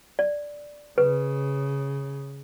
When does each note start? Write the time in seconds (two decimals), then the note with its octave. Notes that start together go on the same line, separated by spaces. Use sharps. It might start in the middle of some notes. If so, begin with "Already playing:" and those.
0.19 D5
0.98 C#3 B4